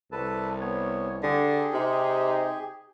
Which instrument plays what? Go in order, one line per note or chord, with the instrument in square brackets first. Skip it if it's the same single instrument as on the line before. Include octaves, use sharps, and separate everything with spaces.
[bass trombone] C2 [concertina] A4 B4 A5
[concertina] B3 C#5
[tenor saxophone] D3 [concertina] G4 G#4
[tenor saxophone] C3 [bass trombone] D#4